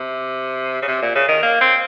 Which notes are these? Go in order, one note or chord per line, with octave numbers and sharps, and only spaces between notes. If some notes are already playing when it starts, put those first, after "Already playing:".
Already playing: C3
C#3
C3
A#2
C#3
D#3
A#3
C4